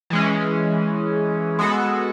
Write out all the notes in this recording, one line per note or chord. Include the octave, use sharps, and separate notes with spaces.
E3 G#3 C#4
G#3 B3 F#4 A4